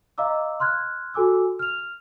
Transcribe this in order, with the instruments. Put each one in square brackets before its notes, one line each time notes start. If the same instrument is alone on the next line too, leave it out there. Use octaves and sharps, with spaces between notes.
[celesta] D#5 F5 A#5 D6 E6
C6 F6 F#6 G#6
F#4 A4 G#5 D6 E6
F6 F7